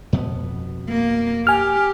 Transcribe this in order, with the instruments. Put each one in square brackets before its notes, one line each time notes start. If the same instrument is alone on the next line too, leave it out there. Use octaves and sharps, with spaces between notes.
[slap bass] F2 B2 B3
[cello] A#3
[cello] G4 [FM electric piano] G#5 F6